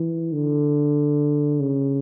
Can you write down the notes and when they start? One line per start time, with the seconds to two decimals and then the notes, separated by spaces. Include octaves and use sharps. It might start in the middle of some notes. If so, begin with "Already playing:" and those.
Already playing: E3
0.33 D3
1.60 C#3